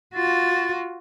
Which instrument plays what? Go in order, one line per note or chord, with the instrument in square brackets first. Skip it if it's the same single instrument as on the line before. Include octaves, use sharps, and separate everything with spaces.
[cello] F4 F#4 [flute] A6